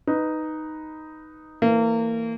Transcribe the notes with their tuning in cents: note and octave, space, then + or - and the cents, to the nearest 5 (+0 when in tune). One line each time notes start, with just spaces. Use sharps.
D#4 +0 B4 +5
E3 -10 A#3 -30